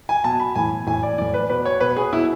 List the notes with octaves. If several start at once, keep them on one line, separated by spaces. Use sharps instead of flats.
G#5
B2 A5
B5
A2 E3 G#5
A2 E3 G#5
D5
A2 E3 D5
B4
B2 B4
C#5
B2 B4
G#4
B2 E4